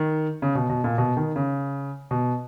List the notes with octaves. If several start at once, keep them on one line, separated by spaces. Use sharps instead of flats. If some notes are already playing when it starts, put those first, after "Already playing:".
Already playing: D#3
C#3
B2
B2
A#2
B2
D#3
C#3
B2